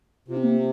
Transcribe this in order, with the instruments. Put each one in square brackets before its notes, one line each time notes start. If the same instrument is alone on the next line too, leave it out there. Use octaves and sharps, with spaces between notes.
[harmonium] C3 [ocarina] F4
[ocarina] C4
A#3